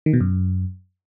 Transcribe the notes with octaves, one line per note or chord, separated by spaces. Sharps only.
D#3
B2
F#2